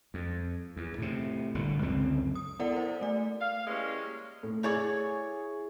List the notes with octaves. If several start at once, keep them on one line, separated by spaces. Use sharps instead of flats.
F2
E2
A2 C3
G1 A#2 D3
C#2 F#2 D3 C4
D#6
B3 E4 A4 A#4 D5 F#5
A#4 C5
A3 D5
F5
E3 G3 G#3 A#3 C#4
A2
A3 E4 G#4 C#5 D5 C#6